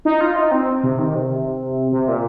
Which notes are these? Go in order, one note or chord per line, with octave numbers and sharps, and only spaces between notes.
D#4
F4
D#4
C4
C3
D#3
C3
C3
A#2